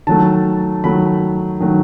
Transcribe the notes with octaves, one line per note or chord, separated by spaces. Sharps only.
D#3 F#3 A3 A5
D#3 F#3 A3 B5
D#3 F#3 A3